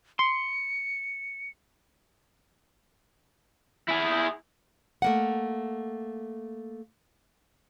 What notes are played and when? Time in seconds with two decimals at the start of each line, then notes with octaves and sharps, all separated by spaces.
0.19 C6 C#7
3.88 E4 G#4
5.02 A3 A#3 F#5